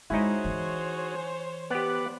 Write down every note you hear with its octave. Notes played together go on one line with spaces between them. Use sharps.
G#3 D#4 E4 F#4 G#4 C5 C#5
E3
B3 G4 B4 D5 F#5